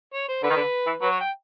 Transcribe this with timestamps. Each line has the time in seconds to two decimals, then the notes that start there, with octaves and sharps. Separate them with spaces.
0.14 C#5
0.29 C5
0.43 D3 B4
0.51 D#3
0.57 D3
0.87 E3
1.01 F#3 B4
1.11 C#5
1.21 G5